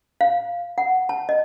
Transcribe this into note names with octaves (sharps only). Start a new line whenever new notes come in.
F5
F#5
A5
D#5